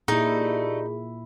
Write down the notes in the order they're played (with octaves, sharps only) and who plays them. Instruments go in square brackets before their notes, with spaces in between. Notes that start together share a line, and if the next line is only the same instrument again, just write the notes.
[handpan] A#2 E4 [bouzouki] G3 A3 [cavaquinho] D#4 [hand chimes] G#4